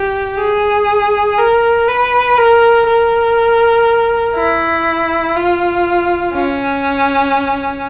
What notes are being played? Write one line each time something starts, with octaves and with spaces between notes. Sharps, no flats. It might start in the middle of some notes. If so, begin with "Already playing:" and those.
Already playing: G4
G#4
A#4
B4
A#4
A#4
E4
F4
C#4